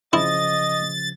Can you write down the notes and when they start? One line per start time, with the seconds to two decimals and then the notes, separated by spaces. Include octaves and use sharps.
0.13 C#3 F3 E4 D#5 A6